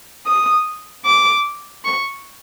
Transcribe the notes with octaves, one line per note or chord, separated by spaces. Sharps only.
D#6
D6
C#6